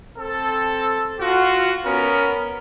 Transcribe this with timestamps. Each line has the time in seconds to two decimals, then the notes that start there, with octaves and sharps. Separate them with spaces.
0.17 C4 A4
1.21 F4 F#4
1.86 B3 C#4 A#4